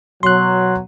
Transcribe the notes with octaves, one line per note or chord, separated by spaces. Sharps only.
B2 F#3 C6 F#6